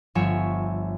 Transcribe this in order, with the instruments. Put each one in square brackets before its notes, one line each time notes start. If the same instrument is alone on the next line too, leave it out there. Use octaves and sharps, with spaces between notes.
[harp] G1 F3 C#5 E5 G#5